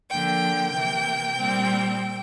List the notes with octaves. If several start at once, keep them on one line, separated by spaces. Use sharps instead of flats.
D3 F3 A#3 G5
C3 E3 A#3
A#2 G3 C4